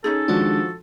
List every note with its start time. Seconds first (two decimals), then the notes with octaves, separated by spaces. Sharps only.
0.04 C#4 D#4 G#4 A4
0.28 D#3 F3 G#3 D4 F#4